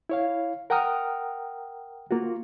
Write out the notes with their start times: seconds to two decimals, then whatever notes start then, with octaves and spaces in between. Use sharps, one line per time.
0.09 E4 C#5 F5
0.70 A#4 F#5 G5 A#5 D#6 F6
2.11 A#3 F4 F#4